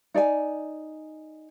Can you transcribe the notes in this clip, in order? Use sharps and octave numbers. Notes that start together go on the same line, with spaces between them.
D#4 D5 E5 G#5